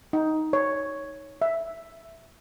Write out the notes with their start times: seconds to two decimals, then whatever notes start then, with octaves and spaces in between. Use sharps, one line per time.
0.13 D#4
0.53 C#5
1.42 E5